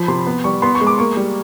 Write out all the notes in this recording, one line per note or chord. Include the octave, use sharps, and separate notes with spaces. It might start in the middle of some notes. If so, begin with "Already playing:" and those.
Already playing: F3 B5
C3 C6
B3
G3 C#6
B3 C6
C#6
G#3
D6
A#3 C#6
G3